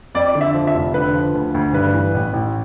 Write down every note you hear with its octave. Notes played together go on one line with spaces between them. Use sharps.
F2 D5
D3
E5
F3
E5
F1
D3 B4
F3
D2
D2
G2 B4
E3
A1
A1